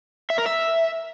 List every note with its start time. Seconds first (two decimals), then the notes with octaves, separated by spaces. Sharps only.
0.30 E5
0.38 A#4
0.46 E5